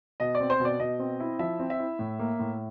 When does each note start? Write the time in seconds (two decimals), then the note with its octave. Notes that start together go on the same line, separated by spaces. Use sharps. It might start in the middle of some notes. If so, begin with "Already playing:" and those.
0.20 B2 D#5
0.35 D5
0.40 C4
0.50 C5
0.60 B2
0.65 D5
0.80 B2 D#5
0.99 C4
1.20 E4
1.39 F3 E5
1.59 C4
1.70 E5
1.80 E4
1.99 A2
2.19 A#3
2.39 A2